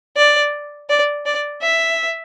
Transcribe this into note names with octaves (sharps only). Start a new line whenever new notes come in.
D5
D5
D5
E5